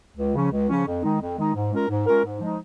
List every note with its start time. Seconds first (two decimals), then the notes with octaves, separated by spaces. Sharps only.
0.17 C#2
0.34 C#3 F3 C#4
0.52 C#2
0.69 C#3 F3 C#4
0.86 F2
1.03 D#3 G#3 D#4
1.21 F2
1.38 D#3 G#3 D#4
1.54 G#2
1.72 G#3 C#4 F4 A#4
1.89 G#2
2.07 G#3 C#4 F4 A#4
2.25 G#2
2.41 F3 G#3 D#4